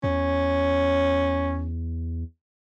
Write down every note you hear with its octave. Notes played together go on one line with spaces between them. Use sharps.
E2 C#4